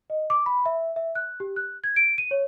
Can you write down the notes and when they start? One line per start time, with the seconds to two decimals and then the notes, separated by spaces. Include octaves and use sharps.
0.10 D#5
0.30 D6
0.46 B5
0.66 E5
0.96 E5
1.15 F#6
1.40 G4
1.56 F#6
1.84 G#6
1.96 D7
2.18 D#7
2.31 C#5